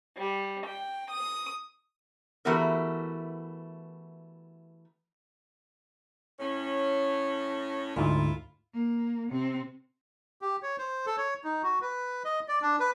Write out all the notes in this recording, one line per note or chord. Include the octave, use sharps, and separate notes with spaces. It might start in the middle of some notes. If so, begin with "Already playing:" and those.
G3
G5
D#6
E3 A3 B3 F#4 G4 A#4
A2 C#4
D2 G#2 D3 E4 F4
A#3
C3 C4
G4
C#5
C5
A4
C#5
D#4
F#4
B4
D#5
D5
D4
B4